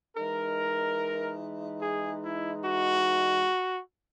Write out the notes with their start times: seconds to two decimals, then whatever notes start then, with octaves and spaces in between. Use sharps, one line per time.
0.16 E3 G#3 D#4 A#4
1.82 G#4
2.24 E4
2.65 F#4